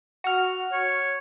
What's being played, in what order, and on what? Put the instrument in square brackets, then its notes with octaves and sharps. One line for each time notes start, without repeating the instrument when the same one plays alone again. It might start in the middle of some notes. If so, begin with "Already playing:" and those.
[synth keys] F#4 F6
[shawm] C#5